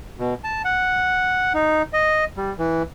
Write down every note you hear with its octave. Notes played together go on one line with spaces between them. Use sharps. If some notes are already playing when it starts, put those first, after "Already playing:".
B2
A5
F#5
D#4
D#5
G3
E3